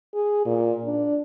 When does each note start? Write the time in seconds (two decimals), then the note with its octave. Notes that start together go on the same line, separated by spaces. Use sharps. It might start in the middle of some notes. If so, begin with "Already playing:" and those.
0.14 G#4
0.45 A#2
0.85 D4